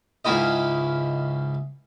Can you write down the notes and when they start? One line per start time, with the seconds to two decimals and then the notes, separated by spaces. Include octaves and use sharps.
0.25 C#2 G#2 C#4 E4 D#5